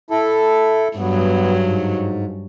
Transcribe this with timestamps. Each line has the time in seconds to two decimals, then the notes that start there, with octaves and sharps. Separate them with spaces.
0.10 E4 A4
0.97 G2 F#3 B3
1.61 G#2